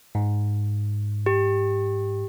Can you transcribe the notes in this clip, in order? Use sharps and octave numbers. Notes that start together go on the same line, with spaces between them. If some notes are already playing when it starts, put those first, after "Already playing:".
G#2
G4